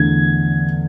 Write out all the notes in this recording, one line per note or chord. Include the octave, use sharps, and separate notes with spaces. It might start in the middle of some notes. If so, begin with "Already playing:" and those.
Already playing: E2 D3 A3 G#6